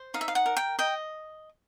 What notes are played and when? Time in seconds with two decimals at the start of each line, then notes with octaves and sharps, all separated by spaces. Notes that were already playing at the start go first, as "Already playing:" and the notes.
Already playing: C5
0.14 D#4 F5
0.21 E5
0.28 F5
0.35 F#5
0.46 A#4
0.57 G5
0.79 D#5 G5